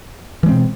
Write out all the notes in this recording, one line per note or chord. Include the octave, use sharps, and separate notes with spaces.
B2 E3 G#3 C4